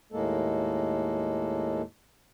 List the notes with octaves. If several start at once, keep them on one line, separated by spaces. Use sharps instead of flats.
D#2 A2 G#3 A#3 A4